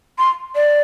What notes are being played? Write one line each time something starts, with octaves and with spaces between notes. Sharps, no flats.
C6
D5